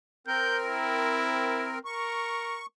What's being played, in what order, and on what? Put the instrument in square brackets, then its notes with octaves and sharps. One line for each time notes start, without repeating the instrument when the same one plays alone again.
[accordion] C4 A#4 [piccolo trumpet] G6
[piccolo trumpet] E4
[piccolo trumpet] A#4 [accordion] C#6